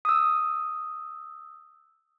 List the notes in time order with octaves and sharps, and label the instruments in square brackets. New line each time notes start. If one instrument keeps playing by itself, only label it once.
[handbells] D#6 E6